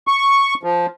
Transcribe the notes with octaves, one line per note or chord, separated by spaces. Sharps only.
C#6
F3